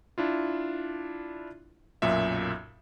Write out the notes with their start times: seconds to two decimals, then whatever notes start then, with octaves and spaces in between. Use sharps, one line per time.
0.18 D4 E4 F4
2.02 B1 F#2 A#2 E5